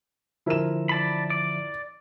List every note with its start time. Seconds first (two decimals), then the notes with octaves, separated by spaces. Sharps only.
0.46 D3 F3 E4 A#4 E5 E7
0.89 D5 A5 B5
1.30 D5 D6